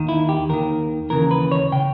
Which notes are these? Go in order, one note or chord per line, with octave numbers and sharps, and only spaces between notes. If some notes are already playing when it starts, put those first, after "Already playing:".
Already playing: D#2 D#3
E4
G4
D#2 D#3 A#4
D#2 C#3 E3 A#4
B4
C#5
C#3 G5